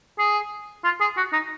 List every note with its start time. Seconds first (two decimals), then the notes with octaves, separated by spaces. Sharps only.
0.19 G#4
0.84 F4
1.00 G#4
1.17 F#4
1.32 D#4